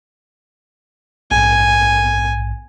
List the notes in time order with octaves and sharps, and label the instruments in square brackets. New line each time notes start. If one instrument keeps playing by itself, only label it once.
[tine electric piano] A#1 G#2 [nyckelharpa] G#5